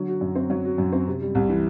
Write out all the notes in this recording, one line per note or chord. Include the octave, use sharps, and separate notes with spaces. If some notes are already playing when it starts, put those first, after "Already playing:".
Already playing: D3 F#3
F#4
F#2
C4
F#3
F#4
F#2
C4
C3
G3
C2
E3